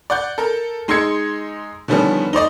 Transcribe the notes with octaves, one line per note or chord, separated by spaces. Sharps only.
D5 F#5 G6
A4 A#4
G#3 D#4 C6 E6 G#6 C#7
D3 D#3 F3 G3 B3 C#4
D#4 C5 D5 D#5